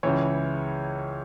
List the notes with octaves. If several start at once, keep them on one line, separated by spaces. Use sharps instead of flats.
C#2 C#3 E3 C#5